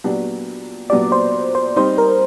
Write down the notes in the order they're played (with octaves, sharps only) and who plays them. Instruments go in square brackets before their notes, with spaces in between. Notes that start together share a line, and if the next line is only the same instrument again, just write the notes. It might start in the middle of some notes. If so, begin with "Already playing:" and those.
[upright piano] A#2 F#3 B3 D4 G4
[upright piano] A#2 F#3 B3 D4 G4 [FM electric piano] D5
[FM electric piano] C5
C5
[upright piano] G3 C4 D#4 [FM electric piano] C5
[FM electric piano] A#4